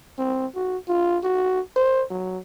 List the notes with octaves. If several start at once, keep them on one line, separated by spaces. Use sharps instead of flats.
C4
F#4
F4
F#4
C5
F#3